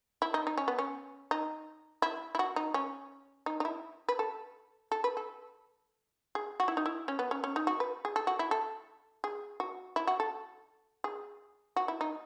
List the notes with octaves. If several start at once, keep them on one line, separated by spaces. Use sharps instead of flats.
E4
D#4
D#4
C#4
B3
C#4
D#4
E4
E4
F#4
D#4
C#4
D#4
D#4
E4
B4
A4
A4
B4
A4
G#4
F#4
E4
D#4
E4
C#4
B3
C#4
C#4
D#4
F#4
B4
G#4
A4
F#4
E4
A4
G#4
F#4
E4
F#4
A4
G#4
F#4
E4
D#4